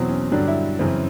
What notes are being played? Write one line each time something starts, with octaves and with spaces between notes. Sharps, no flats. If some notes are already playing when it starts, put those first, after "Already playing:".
Already playing: E2 B2 F#3 C4
C#4
G2 D3 F#3 D4
E4
F#2 C#3 E3 C4